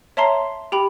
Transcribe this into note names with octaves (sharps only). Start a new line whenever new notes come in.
C#5 E5 A5 A#5 C6 C7
G4 G5 B5